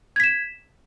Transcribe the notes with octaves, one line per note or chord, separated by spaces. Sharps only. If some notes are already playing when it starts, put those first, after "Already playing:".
G#6 B6 E7